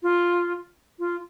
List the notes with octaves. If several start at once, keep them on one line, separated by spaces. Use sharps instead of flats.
F4
F4